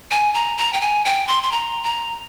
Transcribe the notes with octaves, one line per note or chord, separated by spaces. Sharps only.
G#5
A#5
A#5
G5
G#5
G5
C6
C6
A#5
A#5